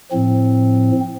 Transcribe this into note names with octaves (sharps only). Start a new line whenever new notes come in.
A2 F3 C4